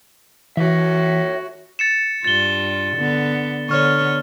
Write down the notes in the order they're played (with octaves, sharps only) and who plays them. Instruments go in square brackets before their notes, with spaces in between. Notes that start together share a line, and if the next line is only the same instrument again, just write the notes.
[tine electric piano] E3 [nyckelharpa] F#4 [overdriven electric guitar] C#5 E5
[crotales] A6 C#7 E7
[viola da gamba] G2 F4 [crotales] A6 G7
[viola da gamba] D3 B3
[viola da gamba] D3 B3 C#5 [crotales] C#6 F6